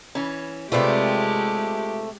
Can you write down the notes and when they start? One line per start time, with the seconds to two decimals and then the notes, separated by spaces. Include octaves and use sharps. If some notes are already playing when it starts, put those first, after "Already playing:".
0.15 E3 C#4
0.72 C3 G#3 A3 F4 G4 B4 D5